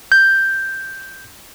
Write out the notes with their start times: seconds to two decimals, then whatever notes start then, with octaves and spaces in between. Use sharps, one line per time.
0.12 G6